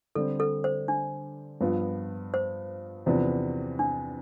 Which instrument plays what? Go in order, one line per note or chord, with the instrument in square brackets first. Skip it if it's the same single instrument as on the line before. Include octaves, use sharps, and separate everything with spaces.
[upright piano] D3 G3 C4 [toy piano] A4
[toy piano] A4
C5
D4
[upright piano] G2 F3 B3 F4
[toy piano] C5
[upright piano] E2 C3 F3 B3 D4
[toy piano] D4